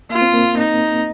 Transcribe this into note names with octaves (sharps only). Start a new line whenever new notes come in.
A#3 F4
C4
A#3
D#4